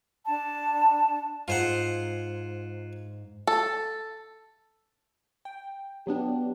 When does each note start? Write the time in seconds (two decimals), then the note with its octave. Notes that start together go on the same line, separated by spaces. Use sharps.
0.26 D4 A5
1.48 G#2 F4 C5 F#5
3.47 A4
5.45 G5
6.07 F#3 B3 D4 G4